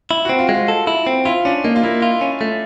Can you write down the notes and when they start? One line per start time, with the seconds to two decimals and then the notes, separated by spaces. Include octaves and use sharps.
0.11 E4
0.25 F#4
0.29 C4
0.39 F4
0.49 G#3
0.54 F4
0.68 A4
0.87 E4
1.07 C4
1.25 E4 F4
1.45 C#4 D4
1.64 A#3 D#4
1.76 F4
1.83 A#3 E4
2.02 F4
2.21 C#4
2.41 A3